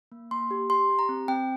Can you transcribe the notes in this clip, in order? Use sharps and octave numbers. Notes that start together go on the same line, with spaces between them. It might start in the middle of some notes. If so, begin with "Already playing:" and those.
A#3
A#3 C6
G4
G4 C6
G4
A#5
C4
C4 G5